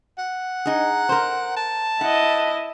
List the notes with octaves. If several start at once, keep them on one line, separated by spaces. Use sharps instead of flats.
F#5
D#4 G#4
A#4 C5
A5
E4 D#5 F#5